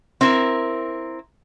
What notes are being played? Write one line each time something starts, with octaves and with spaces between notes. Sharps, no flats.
C4 E4 A#4